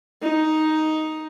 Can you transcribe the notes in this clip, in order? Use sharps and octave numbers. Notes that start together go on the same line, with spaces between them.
D#4